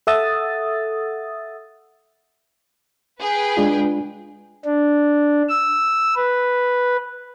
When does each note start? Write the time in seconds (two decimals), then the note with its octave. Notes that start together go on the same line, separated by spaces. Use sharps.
0.07 A4 E5 F#5 D#6 E6 A6
3.22 G#4 B4 G5
3.57 G#3 D4 F4
4.65 D4
5.49 E6
6.16 B4